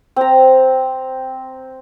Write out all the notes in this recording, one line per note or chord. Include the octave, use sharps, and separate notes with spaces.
C4 A#5